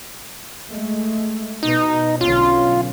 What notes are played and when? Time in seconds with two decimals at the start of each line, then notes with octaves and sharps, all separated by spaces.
0.70 G#3 A3
1.63 B2 D#4
2.21 B1 D3 C#4 F4